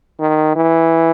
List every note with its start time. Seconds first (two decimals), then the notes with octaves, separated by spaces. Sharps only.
0.19 D#3
0.56 E3